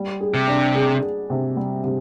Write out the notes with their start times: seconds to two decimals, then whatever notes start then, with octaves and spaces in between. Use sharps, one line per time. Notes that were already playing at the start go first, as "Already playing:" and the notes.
Already playing: G3
0.20 G#4
0.34 C3
0.48 D4
0.75 G#4
1.02 G#4
1.30 C3
1.57 G3
1.84 C3